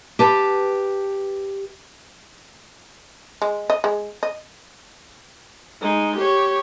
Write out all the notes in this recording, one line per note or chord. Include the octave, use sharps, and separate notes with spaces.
G4 B4 A5
G#3
D#5
G#3
D#5
G#3 D#4
G4 C#5